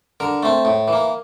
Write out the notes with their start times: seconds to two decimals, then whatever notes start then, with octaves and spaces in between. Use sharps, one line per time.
0.20 D3 A#4
0.43 A3 C4
0.65 A2
0.88 E3
0.93 A#3